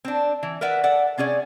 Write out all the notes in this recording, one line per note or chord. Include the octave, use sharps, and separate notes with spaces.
C4 D4
E3
A#4 B4 D5 E5 F#5
A4 D5 F#5
C3 C#4 G#4 D5